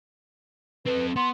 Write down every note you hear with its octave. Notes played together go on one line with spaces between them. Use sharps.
C4 A4 B4
B3 C6